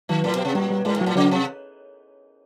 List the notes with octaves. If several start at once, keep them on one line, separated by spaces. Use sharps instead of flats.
D#3 F#3
A2
B2
C3
A#2 G3
G3
A2 G#3
G#2
F#3
A2
C#3 F#3
C3